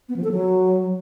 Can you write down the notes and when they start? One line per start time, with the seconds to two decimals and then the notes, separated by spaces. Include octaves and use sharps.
0.09 B3
0.16 F3
0.24 A4
0.31 F#3